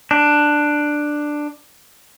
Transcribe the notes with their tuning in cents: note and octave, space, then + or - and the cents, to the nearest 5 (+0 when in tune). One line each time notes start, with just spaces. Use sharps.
D4 +10